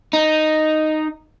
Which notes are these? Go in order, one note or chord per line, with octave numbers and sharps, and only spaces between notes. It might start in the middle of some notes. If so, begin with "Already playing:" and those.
D#4